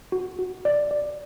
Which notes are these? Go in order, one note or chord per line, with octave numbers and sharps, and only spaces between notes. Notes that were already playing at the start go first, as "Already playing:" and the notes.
F#4
F#4
D5
D5